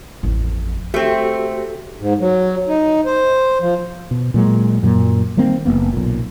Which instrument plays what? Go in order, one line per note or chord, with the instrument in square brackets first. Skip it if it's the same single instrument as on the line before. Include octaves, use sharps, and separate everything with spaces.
[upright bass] A1 F2
[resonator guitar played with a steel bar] A3 C4 [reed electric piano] F#4 G4 A4
[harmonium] G#2
F#3
D#4
C5
F3
[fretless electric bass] B2
A#2 F#3 G#3
F#2 A#2 F#3
D#3 G3 A#3 C4
F#1 A#2 A#3 B3
B1 A#2